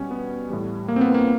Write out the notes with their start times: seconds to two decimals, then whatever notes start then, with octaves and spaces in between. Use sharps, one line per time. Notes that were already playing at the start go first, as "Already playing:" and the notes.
Already playing: B2 G3 C#4
0.11 B3
0.50 A2 E3 G3
0.88 A#3
0.96 C4
1.01 B3
1.14 A#3